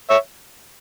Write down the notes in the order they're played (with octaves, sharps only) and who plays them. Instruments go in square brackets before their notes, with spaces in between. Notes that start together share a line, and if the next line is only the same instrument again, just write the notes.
[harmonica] C#5 E5